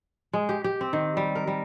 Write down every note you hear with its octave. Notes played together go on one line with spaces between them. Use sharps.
G#3
G4
G4
C4
D#3
G3
A#4
G3